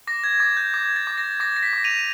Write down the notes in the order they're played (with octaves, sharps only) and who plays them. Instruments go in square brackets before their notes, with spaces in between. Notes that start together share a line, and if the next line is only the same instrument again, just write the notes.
[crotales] D6 A#6
G#6
D6 A6
G6
D6 G#6
A6
D6
A#6
D6 A#6
A#6
B6
D6
D#7 F7